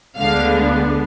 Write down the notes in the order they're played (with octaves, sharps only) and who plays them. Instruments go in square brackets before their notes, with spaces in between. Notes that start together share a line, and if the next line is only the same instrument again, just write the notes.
[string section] D2 D3 G#3 B3 D4 F5